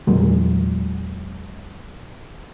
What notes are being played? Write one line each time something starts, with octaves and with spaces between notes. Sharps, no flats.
E2 A#2 F#3 G#3